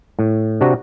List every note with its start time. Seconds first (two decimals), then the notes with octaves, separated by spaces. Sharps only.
0.19 A2
0.61 C3 D4 F#4 A#5